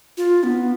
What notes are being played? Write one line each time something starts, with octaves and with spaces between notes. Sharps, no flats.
F4
B3